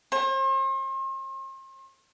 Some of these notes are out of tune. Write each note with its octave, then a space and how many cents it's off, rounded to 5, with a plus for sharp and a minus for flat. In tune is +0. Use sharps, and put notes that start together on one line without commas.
C5 +40